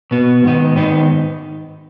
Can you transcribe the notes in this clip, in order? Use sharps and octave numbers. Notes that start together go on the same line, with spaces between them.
B2 B3 F#4
G#2 D#3 B3 D#4
G#2 D#3 B3 D#4